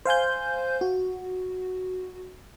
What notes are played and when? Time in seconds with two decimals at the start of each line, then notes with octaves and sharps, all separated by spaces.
0.05 C5 F5 G#5 G6
0.81 F#4